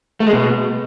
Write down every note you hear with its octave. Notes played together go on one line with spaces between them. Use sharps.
A3
G#3
B2